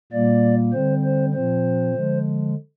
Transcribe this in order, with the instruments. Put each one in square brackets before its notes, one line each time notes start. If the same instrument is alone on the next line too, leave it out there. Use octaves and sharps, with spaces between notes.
[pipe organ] A#2 G3 A#3 D5
D3 G3 C4 C5
C5
A#2 F3 C4 C5
D3 F3 G#3